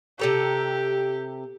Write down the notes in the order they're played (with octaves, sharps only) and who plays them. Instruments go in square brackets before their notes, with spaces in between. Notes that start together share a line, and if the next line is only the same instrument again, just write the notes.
[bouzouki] C3 A4 A#5 [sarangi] G4